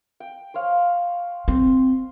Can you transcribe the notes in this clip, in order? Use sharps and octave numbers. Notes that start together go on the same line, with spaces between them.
G5
C5 C#5 F5
C4 C6